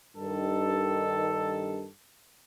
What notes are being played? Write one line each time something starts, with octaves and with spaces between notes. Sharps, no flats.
G2 D#3 A4